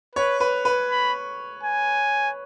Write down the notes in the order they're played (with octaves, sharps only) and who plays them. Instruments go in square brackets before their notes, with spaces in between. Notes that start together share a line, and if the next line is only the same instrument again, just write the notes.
[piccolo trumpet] B4 [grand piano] C#5
[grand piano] B4
B4
[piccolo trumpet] B5
G#5